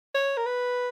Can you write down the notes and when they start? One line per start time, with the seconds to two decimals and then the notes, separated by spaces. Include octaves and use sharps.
0.14 C#5
0.37 A#4
0.46 B4